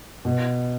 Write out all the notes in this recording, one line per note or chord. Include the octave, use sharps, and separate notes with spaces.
B2